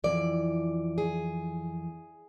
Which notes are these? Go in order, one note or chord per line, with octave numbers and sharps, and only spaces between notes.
F2 E3 D5
G#4